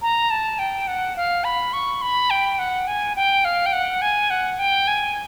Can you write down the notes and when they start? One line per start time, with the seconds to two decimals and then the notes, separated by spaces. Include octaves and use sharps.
0.02 A#5
0.30 A5
0.59 G5
0.87 F#5
1.16 F5
1.44 B5
1.73 C#6
2.02 B5
2.30 G5
2.59 F#5
2.87 G#5
3.16 G5
3.45 F5
3.66 G5
3.73 F#5
4.02 G#5
4.30 F#5
4.59 G5
4.88 G#5